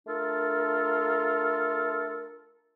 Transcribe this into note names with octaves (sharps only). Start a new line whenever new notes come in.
A3 D4 F4 A4 A#4